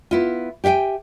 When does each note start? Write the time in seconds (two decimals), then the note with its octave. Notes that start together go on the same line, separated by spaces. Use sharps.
0.11 B3 E4 F4
0.64 G4 E5 F5 G5 G#5